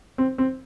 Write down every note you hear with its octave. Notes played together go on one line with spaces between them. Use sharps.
C4
C4